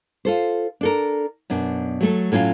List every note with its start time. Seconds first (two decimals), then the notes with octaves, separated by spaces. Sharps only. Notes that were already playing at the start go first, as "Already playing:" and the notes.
0.25 F4 A4 C5
0.81 D4 A4 A#4
1.50 F#2 B2 D4
2.01 F#3 A3 A4
2.32 A2 F#3 C#4 F4 F5